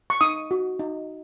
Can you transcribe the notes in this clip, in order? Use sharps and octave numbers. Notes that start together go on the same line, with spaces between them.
C#6
D#4 D#6
F#4
D#4